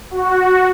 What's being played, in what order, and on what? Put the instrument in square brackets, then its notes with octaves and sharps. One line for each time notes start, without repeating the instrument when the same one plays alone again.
[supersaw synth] F#4